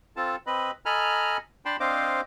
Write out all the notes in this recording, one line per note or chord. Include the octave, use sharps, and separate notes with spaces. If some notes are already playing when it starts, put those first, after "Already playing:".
C4 F4 A4 A5
C4 B4 D#5 B5
A4 D#5 G#5 A#5 B5 F6
D4 G5 A5 B5 C6
C4 D4 C5 D#5 F5 D6